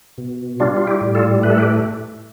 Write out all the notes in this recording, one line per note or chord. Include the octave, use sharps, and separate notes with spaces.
B2
G3 D4 F4
F4
E4 G4
A2
F4 A4
A3 B4
A4
G4 B4